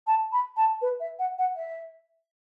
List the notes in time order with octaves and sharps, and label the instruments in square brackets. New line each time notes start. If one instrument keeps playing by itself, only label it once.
[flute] A5
B5
A5
B4
E5
F#5
F#5
E5